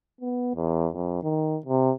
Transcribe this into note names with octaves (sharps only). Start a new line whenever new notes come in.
B3
E2
F2
D#3
C3